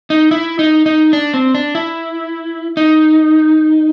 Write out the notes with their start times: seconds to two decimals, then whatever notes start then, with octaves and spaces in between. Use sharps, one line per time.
0.10 D#4
0.31 E4
0.59 D#4
0.86 D#4
1.13 D4
1.34 C4
1.55 D4
1.75 E4
2.77 D#4